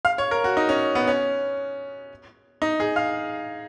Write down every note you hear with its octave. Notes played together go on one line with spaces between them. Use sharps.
F5
C#5
A#4
F#4
D#4
C#4
B3
C#4
D#4
G#4
F5